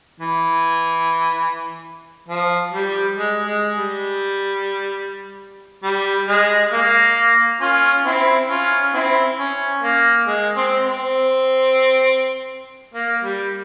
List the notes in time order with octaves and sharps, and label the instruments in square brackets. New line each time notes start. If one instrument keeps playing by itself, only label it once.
[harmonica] E3
F3
G3
G#3
G#3
G3
G3
G#3
A#3
C#4 F4
C4 E4
C#4 F4
C4 E4
C#4
A#3
G#3
C4
C4
A#3
G3